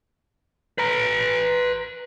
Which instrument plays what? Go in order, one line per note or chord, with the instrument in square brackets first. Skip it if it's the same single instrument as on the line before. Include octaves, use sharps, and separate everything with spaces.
[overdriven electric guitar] B4 A#5